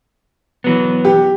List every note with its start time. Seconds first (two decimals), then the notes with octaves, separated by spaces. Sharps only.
0.64 E3 F#3 B3
1.05 G4